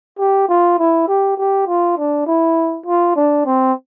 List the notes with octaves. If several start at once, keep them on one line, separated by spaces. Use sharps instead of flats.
G4
F4
E4
G4
G4
F4
D4
E4
F4
D4
C4